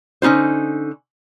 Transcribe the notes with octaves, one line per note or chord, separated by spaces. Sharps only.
D3 C#4 D#4 F4 C5